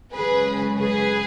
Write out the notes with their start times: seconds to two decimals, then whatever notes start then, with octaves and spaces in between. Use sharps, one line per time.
0.14 F#2 C#3 G#3 G#4 B4
0.78 G#4 B4